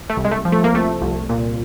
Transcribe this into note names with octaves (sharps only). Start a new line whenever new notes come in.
A3
C2
G#3
A3
F3
A3
A#3
C2 A3
C2
A#2